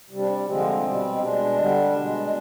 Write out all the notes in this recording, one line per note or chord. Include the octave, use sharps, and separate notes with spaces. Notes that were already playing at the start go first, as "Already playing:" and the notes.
C3 G3
D4
D3 F3 G#3 C4
B2 G3
B2 G#3 D4
D3 G3
B2 G#3